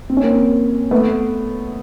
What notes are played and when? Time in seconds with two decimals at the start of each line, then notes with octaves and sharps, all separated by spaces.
0.10 C4
0.17 C#4
0.23 A#3 C4
0.91 A3 B3